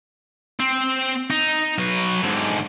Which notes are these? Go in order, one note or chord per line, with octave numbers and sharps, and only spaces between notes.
C4
D#4
F#3 B4
G#2 D3